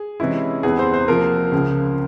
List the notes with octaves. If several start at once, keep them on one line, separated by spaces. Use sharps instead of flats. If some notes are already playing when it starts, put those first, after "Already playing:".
Already playing: G#4
C3 E3 G#3 C#4 E4
E2 C3 E3 G#4
C5
C5
C3 F3 A#3 A#4
C#2 C#3 F3